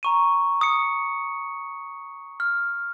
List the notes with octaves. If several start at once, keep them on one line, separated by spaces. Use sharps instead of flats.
A#5 C#6 D#7
D#6 C#7
F6